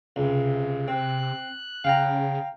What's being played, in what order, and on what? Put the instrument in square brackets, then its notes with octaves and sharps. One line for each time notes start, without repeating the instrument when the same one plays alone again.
[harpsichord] C#2 [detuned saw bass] C3
[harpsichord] C4 [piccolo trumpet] F#6
[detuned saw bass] C#3 [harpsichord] F5 G5 A#5